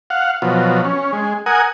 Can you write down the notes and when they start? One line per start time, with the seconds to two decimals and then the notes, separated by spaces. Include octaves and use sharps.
0.10 F5 F#5
0.42 B2 F3 F#3
0.85 C#4
1.13 G#3
1.46 A#4 F#5 G#5 D#6